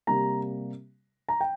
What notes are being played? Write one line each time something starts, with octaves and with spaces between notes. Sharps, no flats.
C3 G3 A#3 A#5
A#5
G5